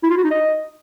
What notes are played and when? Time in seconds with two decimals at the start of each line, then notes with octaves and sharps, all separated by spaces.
0.03 E4
0.10 F4
0.17 F#4
0.24 D#4
0.31 D#5